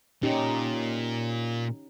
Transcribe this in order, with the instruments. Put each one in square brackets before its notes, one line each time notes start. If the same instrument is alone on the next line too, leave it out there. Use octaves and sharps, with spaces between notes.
[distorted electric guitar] A#2 [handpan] C#4 D#4 G4